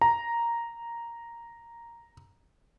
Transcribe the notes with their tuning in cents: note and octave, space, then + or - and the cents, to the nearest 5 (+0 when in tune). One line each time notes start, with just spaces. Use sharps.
A#5 +0